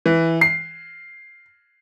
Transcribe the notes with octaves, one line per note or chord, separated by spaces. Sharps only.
E3
C7